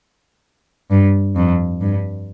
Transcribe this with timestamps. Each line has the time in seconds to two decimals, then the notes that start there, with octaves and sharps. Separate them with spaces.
0.91 G2
1.36 F2
1.81 G2